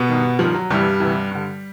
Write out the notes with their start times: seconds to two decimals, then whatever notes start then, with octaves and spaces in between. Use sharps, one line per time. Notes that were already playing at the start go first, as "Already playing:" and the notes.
Already playing: B2 B3
0.09 G2 D#3
0.39 G2 D#3 F3
0.55 F#3
0.70 D2 G2 C3 E3 G3
1.00 D2 C3 E3
1.31 G2 D3